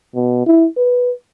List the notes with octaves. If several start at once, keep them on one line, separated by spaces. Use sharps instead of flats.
B2
E4
B4